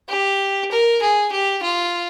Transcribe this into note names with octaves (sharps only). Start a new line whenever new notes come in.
G4
A#4
G#4
G4
F4